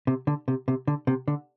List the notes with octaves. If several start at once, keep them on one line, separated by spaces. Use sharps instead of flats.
C3
D3
C3
C3
D3
C3
D3